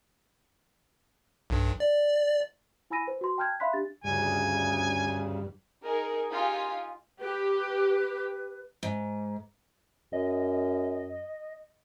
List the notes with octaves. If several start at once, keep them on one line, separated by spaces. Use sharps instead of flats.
B1 G2
D5
E4 G#5 B5 E6 A#6 D#7
B4 C5
F#4 C6
G5 A5 F6 G6 G#6
E5 F5 B5 C6 F#6 B6
D4 G4 A6
D2 G2 C#3 G#5
D#4 G#4 A#4
D#4 F4 G4 G#5
G4 B4
G#2
F#2 D#5